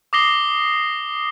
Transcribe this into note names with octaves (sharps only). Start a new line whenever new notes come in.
D6 D#6 A#6 C7 G7